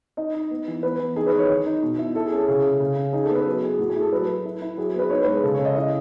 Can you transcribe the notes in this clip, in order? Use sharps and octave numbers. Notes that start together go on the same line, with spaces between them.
D#4 D#5
D#4
B3
E3
B3 B4
E3
D#4 G#4
B4
D#4 C#5
D#3
D#4
B2
E4
E4 A4
G#4
C#4 A4
C#3 G#4
C#3
C#3
C#4
D#4 G#4
A4
B3
B4
F#3
E4 G#4
A2 F#4
G#4
E4 A4
F#3 B4
F#3
E4
E4
F#3 G#4
G#4
B3 B4
D#4 C#5
G#3 B4
G#4
C#3 A4
C#3 C#5
D#5
E4 D#5